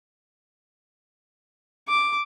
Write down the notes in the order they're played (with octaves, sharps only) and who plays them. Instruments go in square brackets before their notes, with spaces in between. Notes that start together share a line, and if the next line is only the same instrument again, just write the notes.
[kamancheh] D6